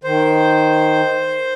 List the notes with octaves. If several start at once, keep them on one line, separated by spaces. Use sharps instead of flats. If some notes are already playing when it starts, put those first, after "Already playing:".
D#3 C5